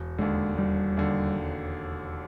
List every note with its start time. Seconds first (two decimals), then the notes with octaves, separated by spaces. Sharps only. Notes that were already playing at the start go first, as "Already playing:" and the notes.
Already playing: E1
0.18 D#2 D3 G#3
0.58 E1 G3
0.97 D#2 D3